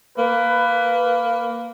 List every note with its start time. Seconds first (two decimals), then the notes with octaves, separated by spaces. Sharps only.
0.18 A#3 B4